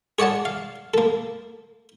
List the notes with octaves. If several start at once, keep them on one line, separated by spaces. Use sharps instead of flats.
G#4 C#5 D5 F#5 A5
F5
A#3 A4